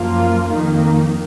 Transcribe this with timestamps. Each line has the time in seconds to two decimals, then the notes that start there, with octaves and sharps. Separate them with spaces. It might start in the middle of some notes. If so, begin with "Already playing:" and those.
Already playing: F#2 F3 A#3 F4
0.50 F2 D#3 A#3 D#4